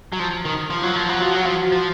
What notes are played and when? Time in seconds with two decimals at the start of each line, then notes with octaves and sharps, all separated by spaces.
0.13 F#3
0.19 F3
0.45 D#3
0.70 F3 F4
0.83 F#3
0.96 F3
1.09 F#3
1.21 F3 F#4
1.35 F#3
1.46 F3
1.72 F3